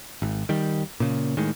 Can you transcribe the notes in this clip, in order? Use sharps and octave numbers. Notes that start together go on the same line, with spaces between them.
G#1
D#3 G3
A#2 C#3
A2 D#3 G#3